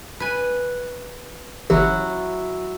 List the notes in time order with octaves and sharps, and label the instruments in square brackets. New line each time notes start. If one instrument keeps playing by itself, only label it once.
[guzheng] B4 G#5
[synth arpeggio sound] G1 E3 G4 [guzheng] F#3 E4 F#4